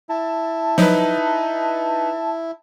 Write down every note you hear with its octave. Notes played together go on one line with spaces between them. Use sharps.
E4 A5
F3 F#3 D#4 B4